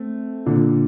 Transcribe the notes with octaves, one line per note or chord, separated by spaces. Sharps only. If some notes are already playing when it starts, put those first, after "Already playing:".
Already playing: A3 C4
A#2 D3